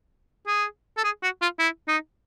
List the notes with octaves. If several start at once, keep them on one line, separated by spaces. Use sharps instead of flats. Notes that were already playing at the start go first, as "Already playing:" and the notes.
G#4
A4
G#4
F#4
F4
E4
D#4